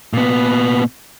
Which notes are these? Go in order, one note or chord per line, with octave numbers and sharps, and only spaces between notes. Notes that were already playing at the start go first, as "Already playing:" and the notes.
A#2 B3